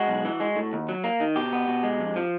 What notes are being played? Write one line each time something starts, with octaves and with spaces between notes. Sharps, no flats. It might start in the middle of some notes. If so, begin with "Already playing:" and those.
Already playing: G#3 F#4
B1
E3
G#3
A2
D#2
F#3
A#3
D#3
B2 G4
B3
B2
G#3
F2
F3